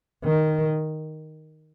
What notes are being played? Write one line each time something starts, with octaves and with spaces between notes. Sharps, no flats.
D#3